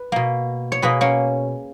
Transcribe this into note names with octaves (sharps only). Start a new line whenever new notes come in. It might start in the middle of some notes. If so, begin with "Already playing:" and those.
Already playing: B4
B2 A#3
C#5
B2 A#3 G#4 B4
A#3 C#4